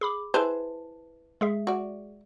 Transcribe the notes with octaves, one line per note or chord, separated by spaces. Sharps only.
G#4 B5 D6
E4 G#4 B4 C5 A5
G#3 G#4 E5
F#4 D5